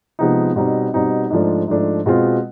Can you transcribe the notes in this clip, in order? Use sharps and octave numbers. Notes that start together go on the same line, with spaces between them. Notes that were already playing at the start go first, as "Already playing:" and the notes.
C3 F3 G#3 B3 D#4
B2 G3 C4 D#4
B2 G3 C4 D#4
G#2 F3 A3 D4
G#2 F3 A3 D4
B2 G#3 C4 F4